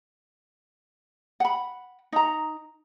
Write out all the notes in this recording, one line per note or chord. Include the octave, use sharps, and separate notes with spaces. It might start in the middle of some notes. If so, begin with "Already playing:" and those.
F#5 B5
D#4 A#5